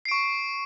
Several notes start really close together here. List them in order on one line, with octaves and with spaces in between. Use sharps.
C7 D7 C#6